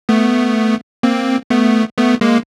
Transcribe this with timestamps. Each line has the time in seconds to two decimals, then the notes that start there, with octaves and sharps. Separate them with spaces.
0.09 A3 B3
1.03 A#3 C4
1.50 A3 B3
1.98 A3 B3
2.21 G#3 A#3